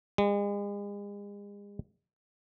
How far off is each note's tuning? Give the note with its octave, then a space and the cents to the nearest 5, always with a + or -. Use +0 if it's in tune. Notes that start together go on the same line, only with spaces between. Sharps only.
G#3 -40